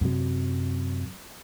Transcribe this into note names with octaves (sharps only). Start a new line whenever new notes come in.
F#2 C3 F#3